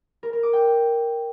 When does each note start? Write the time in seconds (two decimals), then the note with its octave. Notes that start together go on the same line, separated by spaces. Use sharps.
0.23 A#4
0.33 A#4
0.43 D6
0.53 G5